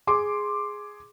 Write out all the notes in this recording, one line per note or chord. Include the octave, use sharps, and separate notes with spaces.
G#4 C6 D6